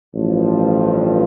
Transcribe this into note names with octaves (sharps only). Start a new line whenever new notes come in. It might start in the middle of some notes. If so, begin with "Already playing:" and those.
A1 G2 F3